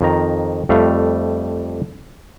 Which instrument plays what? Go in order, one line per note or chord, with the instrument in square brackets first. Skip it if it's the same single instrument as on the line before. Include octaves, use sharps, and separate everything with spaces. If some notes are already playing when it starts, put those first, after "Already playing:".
[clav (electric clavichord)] F2 D#3 A#5
F2 G3 A3 F5